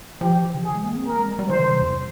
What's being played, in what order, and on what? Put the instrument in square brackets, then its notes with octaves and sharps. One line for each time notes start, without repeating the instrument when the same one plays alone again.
[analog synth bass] F3 [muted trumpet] G4
[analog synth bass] E3
C#3
[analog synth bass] E3 [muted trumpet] G#4
[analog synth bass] G#3
A#3
C4
[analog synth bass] A#3 [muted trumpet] A#4
[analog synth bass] G#3
G3
G3
[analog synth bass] E3 [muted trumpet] C5
[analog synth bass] C#3
C3
E2